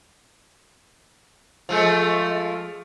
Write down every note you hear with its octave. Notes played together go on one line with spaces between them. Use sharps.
F3 G#3 A3